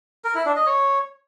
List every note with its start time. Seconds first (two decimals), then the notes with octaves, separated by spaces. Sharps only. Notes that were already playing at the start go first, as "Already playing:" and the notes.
0.24 A#4
0.35 E4
0.45 D4
0.56 D#5
0.66 C#5